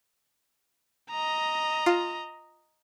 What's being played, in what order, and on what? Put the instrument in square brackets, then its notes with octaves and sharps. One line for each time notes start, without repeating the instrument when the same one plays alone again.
[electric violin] D#5 A#5
[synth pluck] F4